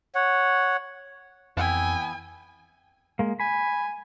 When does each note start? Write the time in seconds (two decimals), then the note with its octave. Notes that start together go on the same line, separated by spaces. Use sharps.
0.15 C#5 F#5
1.57 F2 E3 B3 E4 G5 G#5
3.19 G#3 A#3
3.40 G#5 B5